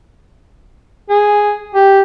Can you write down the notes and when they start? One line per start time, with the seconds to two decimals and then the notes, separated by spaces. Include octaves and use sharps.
1.09 G#4
1.75 G4